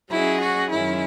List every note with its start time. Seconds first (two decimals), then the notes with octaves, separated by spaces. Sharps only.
0.11 F#3 C#4 E4 G#4 D#5
0.41 F#4
0.71 F#2 D#3 G#3 C#4 E4